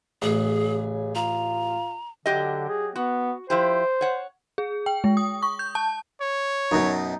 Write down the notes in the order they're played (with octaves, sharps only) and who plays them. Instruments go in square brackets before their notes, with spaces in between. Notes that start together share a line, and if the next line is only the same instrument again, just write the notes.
[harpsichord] A1 [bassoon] C#3 [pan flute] G#4
[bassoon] F4 [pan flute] A#5
[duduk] D3 [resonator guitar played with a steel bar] F#3 G4 D#5
[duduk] G#4
[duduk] B3 [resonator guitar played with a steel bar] F#4
[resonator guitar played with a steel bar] F3 E4 G4 [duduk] C5
[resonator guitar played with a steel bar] C#5 F#5
[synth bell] G#4
G5
G#3
D#6
C#6
G6
A5
[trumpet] C#5
[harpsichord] F#2 B2 [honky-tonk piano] D#4